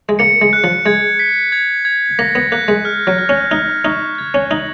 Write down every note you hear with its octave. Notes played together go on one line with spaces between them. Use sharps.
G#3
A#3 C#7
G#3
F#6
F3
G#3 G#6
B6
G#6
G#6
A#3 A#6
B3
A#3 F#6
G#3
F6
F#3
F6
C#4
D#4 F6
D#4 C#6
G#6
C#4
D#4 F#7